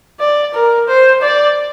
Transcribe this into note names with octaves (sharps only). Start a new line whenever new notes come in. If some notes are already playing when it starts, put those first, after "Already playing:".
D5
A#4
C5
D5